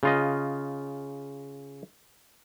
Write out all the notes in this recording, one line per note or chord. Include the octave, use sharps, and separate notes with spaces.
C#3 F4 D#5